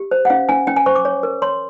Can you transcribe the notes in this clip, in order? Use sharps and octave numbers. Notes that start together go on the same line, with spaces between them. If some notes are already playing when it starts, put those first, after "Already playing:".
Already playing: G4
C5
F#5
C#4 F5
C#4 G#5
C#4 G5
G#5
C5 C#6
D6
C#5
A#4
C#5 C6